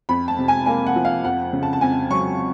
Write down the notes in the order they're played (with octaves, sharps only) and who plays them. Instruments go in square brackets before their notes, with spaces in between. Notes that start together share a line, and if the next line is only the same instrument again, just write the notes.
[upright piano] F2 B5
A5
C3
G#5
A#3 G#5
F#5
F3
F5
F2 F#5
C#3
A5
A5
F2 G#5
F#3 C#6